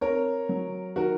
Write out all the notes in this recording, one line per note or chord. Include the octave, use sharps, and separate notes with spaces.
C4 A#4 C#5
F#3
D#3 F#4 A#4